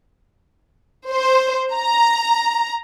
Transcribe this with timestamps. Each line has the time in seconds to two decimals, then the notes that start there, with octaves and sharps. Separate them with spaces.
1.09 C5
1.74 A#5